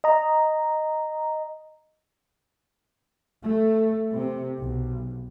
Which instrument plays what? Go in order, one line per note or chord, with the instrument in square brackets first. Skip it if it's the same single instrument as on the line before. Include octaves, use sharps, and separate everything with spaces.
[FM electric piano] D#5 A#5
[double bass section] A3
C3
B1